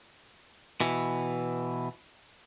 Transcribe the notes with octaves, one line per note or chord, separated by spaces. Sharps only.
B2 E3